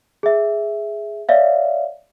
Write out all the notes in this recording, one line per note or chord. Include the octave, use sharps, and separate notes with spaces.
G#4 E5
C#5 D5 E5 F5